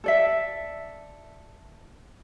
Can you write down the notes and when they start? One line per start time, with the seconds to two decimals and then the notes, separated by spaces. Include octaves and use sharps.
0.04 A4 D5 E5